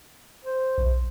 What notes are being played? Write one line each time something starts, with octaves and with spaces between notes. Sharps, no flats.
C5
B1